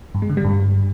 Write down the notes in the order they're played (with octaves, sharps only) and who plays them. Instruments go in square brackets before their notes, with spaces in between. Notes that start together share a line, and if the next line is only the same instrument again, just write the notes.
[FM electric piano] G2
G#3
D3
G3
G2